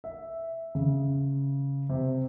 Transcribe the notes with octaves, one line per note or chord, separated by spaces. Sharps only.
E5
C#3
C3